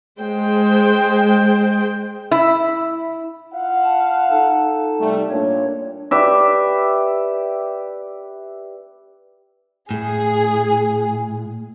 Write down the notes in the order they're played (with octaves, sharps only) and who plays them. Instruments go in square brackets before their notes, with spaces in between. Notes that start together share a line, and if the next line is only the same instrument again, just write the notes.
[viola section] G#3 C5 G5
[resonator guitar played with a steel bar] E4
[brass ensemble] F4 F5 F#5
[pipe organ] A5
D#4 A4 A5
[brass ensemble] C3 G3 A3
[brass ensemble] A#2 [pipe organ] D4 C#5
[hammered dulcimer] G4 B4 D5 E5
[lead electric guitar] A2 [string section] G#4